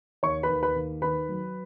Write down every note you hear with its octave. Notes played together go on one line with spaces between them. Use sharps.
D#2 C#5 C#6
B4 B5
D#2
B4 B5
D#2
D#3 B4 B5
F#3